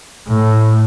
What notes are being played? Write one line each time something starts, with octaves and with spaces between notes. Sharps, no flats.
A2